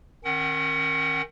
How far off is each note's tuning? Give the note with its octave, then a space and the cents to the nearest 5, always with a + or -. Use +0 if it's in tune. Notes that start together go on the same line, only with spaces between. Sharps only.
D#3 +0 C#4 -35 F#5 +30